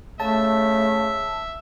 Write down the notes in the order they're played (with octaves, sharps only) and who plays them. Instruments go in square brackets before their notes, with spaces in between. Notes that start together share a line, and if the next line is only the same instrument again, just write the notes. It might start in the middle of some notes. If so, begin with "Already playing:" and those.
[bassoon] C#3 [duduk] A3 [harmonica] E5 [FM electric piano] A5